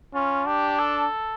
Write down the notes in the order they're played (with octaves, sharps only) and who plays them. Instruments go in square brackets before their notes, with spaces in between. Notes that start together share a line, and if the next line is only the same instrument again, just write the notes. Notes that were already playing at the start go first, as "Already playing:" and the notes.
[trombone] C#4 [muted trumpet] F4
[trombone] D4 [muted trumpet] G4
[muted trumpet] A4